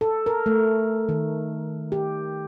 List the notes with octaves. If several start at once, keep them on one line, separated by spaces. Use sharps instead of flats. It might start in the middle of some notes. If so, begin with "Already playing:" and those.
A4
A#4
A3
D#3
G4